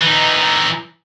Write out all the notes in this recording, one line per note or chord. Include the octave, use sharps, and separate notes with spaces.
E3 D#4